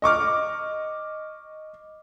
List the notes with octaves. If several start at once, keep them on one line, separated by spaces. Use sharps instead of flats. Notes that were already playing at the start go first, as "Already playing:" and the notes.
D#5 C#6 D6 F6